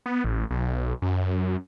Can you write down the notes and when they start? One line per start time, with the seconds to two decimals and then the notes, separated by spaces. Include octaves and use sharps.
0.06 B3
0.24 A1
0.51 B1
1.02 F#2